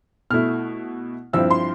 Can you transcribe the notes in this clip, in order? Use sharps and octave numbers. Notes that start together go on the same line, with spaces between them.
B2 A3 E4 F6
G2 F3 C4 E4 E6
C6